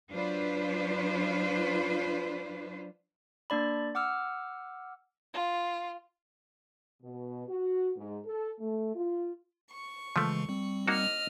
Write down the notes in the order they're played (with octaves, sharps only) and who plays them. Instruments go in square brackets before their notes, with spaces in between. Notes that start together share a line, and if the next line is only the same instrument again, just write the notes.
[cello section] F#3 D4 F4 B4 C5
[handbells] A#3 D4 D5 B5
F#5 D6 E6 F6
[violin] F4
[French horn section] B2
F#4
G#2
A4
A3
F4
[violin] C#6
[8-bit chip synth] C#3 E3 G#3 [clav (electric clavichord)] F3 A3
[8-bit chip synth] G3 C4
[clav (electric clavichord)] A#3 D#4 F#4 [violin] D#5 F6